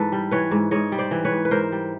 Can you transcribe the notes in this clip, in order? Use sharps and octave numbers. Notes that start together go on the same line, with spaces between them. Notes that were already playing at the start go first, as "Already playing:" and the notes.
Already playing: G#2 E3 A4 B4
G3
E3 B4 C#5
G#2
G#2 C#5 D#5
G3
C5 D5
E3
B4 C#5
G#2
B4
G#2 A#4 C5
G3